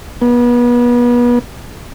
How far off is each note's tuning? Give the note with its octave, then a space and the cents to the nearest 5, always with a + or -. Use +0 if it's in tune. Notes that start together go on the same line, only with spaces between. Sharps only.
B3 -30